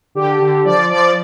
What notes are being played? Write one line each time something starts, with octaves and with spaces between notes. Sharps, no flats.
D3 G4
D3
F3 D5
F3 D5